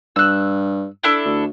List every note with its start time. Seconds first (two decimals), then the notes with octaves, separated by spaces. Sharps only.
0.16 G2 E6 F#6
1.03 D4 E4 A4
1.26 D2